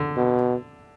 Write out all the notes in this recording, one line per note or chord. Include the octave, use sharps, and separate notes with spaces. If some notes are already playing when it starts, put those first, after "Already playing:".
Already playing: D3
B2